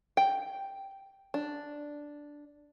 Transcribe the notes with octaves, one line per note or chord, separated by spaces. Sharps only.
G5
D4